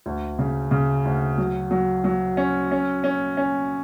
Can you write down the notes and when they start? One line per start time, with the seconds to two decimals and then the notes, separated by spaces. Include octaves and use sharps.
0.06 D2
0.39 C#3
0.71 C#3
1.05 D2
1.38 F#3
1.71 F#3
2.04 F#3
2.37 C#4
2.71 C#4
3.04 C#4
3.37 C#4